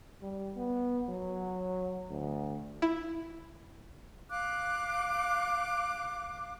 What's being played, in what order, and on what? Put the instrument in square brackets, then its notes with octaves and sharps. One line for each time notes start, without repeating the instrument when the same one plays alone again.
[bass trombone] G3
B3
F#3
D2
[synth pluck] E4
[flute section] F5 D6 F#6